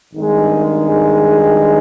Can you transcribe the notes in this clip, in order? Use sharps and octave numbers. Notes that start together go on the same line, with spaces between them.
G#1 G2 D#3 G#3